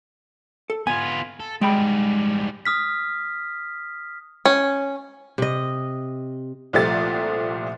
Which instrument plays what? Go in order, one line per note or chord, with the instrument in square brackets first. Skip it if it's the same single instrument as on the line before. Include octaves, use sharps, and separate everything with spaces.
[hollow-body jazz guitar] A4
[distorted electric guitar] B3 F4 [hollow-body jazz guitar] G#5
[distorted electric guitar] A4
[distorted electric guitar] G#2 G3 [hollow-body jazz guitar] G#3 G5 B5
[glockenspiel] D#6 F6 B6
[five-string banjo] C#4
[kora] C3 D#5
[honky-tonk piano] C2 A#2 F3 A3 G4 A6